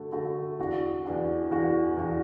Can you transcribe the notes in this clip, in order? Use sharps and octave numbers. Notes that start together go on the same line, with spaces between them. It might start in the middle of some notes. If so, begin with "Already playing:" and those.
Already playing: D3 A3 F#4 A4
D3 A3 F#4 A4
E2 E3 D4 F#4
E2 E3 D4 F#4
E2 E3 D4 F#4
E2 E3 D4 F#4